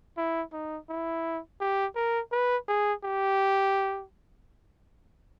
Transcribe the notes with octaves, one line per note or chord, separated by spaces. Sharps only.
E4
D#4
E4
G4
A#4
B4
G#4
G4